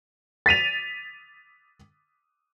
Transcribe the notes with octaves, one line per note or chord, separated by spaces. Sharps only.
A6 B6 D#7 F7